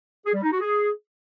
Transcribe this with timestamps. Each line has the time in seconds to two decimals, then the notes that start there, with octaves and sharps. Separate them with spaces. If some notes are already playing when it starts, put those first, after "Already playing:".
0.25 G#4
0.34 G3
0.43 D#4
0.51 F#4
0.60 G#4